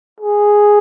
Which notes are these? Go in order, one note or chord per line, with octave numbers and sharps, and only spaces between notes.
G#4